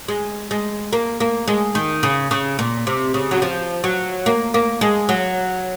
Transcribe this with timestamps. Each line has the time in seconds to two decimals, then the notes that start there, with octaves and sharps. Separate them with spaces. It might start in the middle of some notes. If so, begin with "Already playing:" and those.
0.08 G#3
0.51 G#3
0.93 A#3
1.20 A#3
1.48 G#3
1.75 D#3
2.03 C#3
2.31 C#3
2.59 A#2
2.87 C3
3.14 C#3
3.31 F#3
3.42 F3
3.84 F#3
4.26 A#3
4.54 A#3
4.81 G#3
5.09 F#3